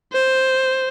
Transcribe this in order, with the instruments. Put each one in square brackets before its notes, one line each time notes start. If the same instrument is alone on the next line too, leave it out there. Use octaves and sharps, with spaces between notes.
[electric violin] C5